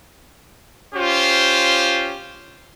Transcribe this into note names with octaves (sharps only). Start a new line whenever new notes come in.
C#4 F4 G4 C5